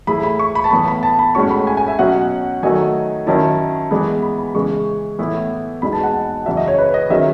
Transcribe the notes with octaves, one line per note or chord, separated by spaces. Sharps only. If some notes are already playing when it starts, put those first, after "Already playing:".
A2 E3 A3 E4 G#4 B5
B5
C#6
B5
A5
A2 E3 B3 B5
B5
A5
B5
A2 G#3 C#4 F#4 C#6
B5
G#5
G#5
E5
B2 F#3 C#4 F#4 F#5
D#3 F#3 A3 D#4 F#4 G#5
D#3 F#3 C#4 E4 A5
E3 G#3 B3 B5
B5
B5
C#3 E3 G#3 C#6
A2 E3 B3 E4
E2 B2 G#3 D#4 B5
A5
F#5
F#2 C#3 E3 E5
D#5
C#5
B4
D#5
D#3 F#3 C#4 G#4 E5